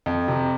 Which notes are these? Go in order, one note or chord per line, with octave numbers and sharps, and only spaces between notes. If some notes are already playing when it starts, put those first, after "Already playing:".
F2
C3